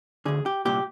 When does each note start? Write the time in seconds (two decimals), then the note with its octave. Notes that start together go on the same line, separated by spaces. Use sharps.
0.25 D2 D3 G#4
0.46 G4
0.65 C2 A#2 G4